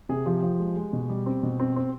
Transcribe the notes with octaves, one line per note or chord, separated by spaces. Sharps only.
C3 G#4
F3 G4
F3
G#3
G#3
B2
G3
C4
B2
C4
C4